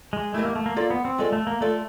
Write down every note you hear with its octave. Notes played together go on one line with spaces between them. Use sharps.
G#3
A3 E4 G4 A#4 D#5
A#3
A3
A#3
A#3 F4 A4 D5
B3
C4
G#3 F4 A4 D5
A3
A#3
A3 F4 A4 D5